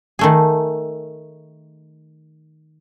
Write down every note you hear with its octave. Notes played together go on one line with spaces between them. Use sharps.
D#3 A3 G#4